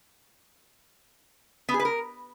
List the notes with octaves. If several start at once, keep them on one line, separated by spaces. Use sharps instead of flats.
B3
G#4
B4
A#4